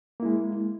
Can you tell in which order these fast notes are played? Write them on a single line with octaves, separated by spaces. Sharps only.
A#3 E4 G#3